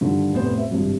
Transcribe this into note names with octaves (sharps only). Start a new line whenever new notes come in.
G2 D3 D#3 F3
F1 A2 B3 C5
E5
G#1 G2 C3 F3 G3